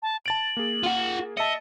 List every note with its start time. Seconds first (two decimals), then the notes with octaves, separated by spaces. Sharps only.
0.02 A5
0.26 A5 A6 D7 F#7
0.57 A#3 G#4
0.83 F4 F#5
1.37 D#5 E5 A5 C#7